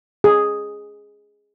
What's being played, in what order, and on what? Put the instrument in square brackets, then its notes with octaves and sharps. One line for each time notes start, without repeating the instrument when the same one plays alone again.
[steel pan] G#4